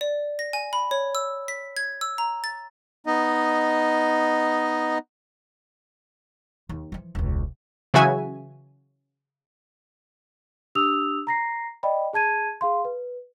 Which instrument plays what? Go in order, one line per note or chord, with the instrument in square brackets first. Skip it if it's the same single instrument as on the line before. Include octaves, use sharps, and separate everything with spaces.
[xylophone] D5
A#6
G#5
B5
C#5
E6
B6
G#6
E6
A#5
A6
[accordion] B3 D#4 D#5
[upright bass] D#2
E3 F3
E1 C#2
[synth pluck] C#3 E3 F#3 F#4 E5 G#5
[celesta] D4 G4 D#6 E6 F7
A#5 A#6 C7
D5 D#5 G5 B5
G#4 A5 G#6 D#7
G#4 F5 C6
B4